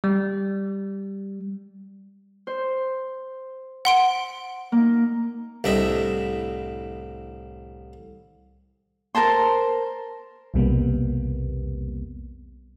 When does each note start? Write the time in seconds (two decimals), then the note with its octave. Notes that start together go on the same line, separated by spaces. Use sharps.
0.04 G3
2.47 C5
3.85 F#5 C6 D7
4.72 A#3 D#4
5.64 C2 A2 D4 D#5 E5
9.15 A#4 C5 A5 C6
10.54 B1 E2 C3 G3 A#3 B3